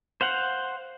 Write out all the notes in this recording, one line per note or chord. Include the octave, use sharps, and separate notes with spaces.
C5 F5 F#5